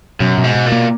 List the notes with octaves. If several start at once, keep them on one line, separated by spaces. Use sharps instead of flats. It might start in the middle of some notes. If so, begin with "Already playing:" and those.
F#2 B2
B2
G#2
B2
A#2
A#3